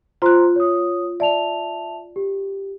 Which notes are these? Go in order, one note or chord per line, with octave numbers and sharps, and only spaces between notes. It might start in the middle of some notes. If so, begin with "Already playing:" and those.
F4 C5 A#5 C6 F#6
C#5 D#6
D5 E5 A5 F7
G4